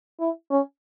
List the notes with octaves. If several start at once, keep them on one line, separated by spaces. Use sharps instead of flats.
E4
C#4